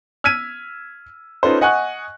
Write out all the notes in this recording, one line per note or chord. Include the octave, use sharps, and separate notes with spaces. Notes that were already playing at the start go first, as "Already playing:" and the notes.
E6 F6 G#6 B6 D#7
C#4 D#4 F4 A4 B4 C5
D#5 F#5 G#5 C#6 F#6